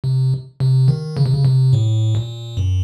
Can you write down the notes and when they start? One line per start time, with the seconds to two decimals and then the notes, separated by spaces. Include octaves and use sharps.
0.04 C3
0.60 C3
0.88 D#3
1.17 C#3
1.26 C3
1.34 C#3
1.45 C3
1.73 A2
2.15 A#2
2.57 F#2